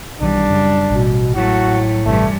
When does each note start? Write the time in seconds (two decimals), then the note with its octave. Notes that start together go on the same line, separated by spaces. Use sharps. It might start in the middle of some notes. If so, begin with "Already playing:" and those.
0.21 B1 D#3 E3 G3 D4
0.50 F#2 C#3
0.90 A1 B2
1.35 A2 F#3 A3 F#4
2.06 A1 G2 C3 E3 A3